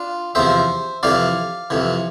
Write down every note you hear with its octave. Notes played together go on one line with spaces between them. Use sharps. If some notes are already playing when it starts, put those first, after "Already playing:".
Already playing: D4 F4
E2 C3 F3 C5 E5
F2 C3 E3 D5 F5
F2 C3 E3